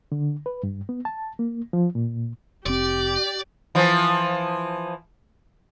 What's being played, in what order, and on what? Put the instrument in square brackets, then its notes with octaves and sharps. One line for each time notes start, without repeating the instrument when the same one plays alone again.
[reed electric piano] D3
B4
G2
B3
A5
A#3
F3
A#2
[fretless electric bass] F1 C4 [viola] G4 [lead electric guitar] D5
[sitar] E3 F3